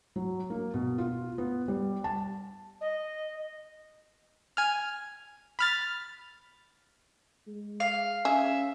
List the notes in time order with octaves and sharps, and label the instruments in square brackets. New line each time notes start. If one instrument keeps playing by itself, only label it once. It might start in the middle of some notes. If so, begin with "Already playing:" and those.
[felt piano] F#3
A#3
B2
F4
B3
G3
A5
[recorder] D#5
[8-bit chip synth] G#5 F6
B5 F6 A6
[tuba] G#3
[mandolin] F5
[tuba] C#4 [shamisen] G#4 [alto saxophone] E5